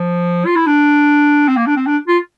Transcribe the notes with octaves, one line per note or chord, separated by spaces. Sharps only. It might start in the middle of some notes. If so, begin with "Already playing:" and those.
Already playing: F3
F4
E4
D4
C4
A#3
D4
C4
D4
F4